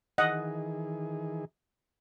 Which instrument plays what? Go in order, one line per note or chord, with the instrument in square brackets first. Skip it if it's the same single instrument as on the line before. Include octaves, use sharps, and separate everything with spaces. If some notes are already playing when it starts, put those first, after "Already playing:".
[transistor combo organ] D#3 E3 G#4 [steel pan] D#5 F#5